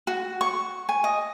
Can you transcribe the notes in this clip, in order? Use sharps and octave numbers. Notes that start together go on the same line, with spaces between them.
F#4
C#6
G#5
D#5